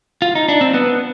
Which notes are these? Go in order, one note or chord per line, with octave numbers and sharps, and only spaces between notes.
F4
D#4
D4
C4
B3